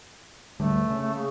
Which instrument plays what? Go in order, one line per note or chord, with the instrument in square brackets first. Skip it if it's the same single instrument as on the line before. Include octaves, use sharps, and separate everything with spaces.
[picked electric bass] D1 D3 G3 [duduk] A3
[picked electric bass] C#3
[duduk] A3
C#3